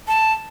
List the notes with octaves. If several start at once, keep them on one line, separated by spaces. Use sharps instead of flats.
A5